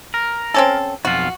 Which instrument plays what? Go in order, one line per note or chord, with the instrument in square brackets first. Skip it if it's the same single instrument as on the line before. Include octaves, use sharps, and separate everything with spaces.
[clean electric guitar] A#4
[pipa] C4 C#4 A4
[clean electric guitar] B1 F2 F4 [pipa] F#4